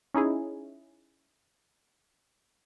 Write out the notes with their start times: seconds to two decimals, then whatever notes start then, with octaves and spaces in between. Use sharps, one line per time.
0.14 C#4 D#4 E4 G#4